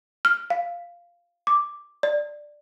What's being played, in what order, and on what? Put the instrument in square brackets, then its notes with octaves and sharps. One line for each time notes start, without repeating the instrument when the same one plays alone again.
[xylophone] F6
F5
D6
D5